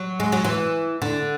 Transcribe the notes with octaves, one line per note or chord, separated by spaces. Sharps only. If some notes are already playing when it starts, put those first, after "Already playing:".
Already playing: F#3
G#3
F#3
E3
D3